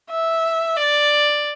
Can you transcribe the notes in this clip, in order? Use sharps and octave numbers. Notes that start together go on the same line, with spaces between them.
E5
D5